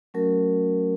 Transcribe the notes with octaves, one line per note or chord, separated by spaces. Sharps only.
F#3 A3 C#4 F#4 A#4